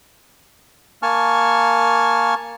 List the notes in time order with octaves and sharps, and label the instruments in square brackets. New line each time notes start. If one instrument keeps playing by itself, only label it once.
[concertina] A#3 G#5 A5 C#6 F6